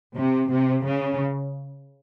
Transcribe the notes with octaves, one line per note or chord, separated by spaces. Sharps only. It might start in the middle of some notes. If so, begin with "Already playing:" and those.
C3
C3
C#3